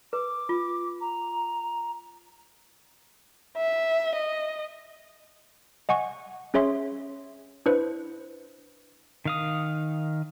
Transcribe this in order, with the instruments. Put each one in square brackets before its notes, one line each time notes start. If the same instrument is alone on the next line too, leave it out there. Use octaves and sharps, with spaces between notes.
[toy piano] B4 [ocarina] D6
[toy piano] F4
[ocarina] A#5
[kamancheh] E5
D#5
[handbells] D#5 F#5 G#5 C#6
C#4 G#4 C#5 E5 C6
D4 E4 B4 C5
[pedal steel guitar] D#3 F5 D#6